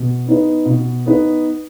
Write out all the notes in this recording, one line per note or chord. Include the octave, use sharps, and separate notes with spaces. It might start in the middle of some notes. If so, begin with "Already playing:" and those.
Already playing: B2
B3 D#4 B4
B2
B3 D#4 B4